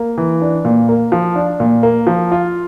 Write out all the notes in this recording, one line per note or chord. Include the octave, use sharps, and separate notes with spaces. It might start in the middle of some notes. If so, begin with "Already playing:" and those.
Already playing: A#3
E3
D4
A#2
A#3
F3
D4
A#2
A#3
F3
F4